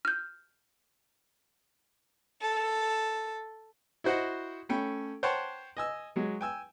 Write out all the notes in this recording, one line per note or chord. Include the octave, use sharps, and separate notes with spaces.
F6 G6
A4
E4 F#4 C5 D#5 F#5
A3 C#4 G5 B5
C5 C#5 F#5 G5 A5 C6
D#5 G#5 E6
F#3 G#3
G5 G#5 E6